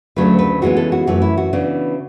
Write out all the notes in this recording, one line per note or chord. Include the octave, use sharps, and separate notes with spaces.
D2 C#3 F#3 A3 D4 B4
B4
C#3 E3 G#3 B3 F#4
A4
F#4
F#2 E3 A3 F#4
E4
F#4
C#3 E3 B3 D4